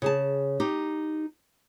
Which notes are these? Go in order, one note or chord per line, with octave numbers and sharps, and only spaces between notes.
C#3 G#4 A5
D#4 G4